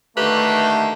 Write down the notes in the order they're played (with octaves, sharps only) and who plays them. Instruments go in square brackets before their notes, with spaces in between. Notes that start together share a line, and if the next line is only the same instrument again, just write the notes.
[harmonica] D3 D#3 A#3 [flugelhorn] A3 [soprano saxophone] G4 [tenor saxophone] B4